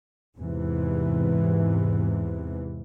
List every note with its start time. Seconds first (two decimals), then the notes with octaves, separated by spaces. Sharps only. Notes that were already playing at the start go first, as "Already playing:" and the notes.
0.39 E2 G#2 C3 E3